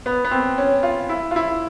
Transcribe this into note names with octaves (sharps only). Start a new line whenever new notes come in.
B3
B3
C4
C#4
F4
E4
F4
E4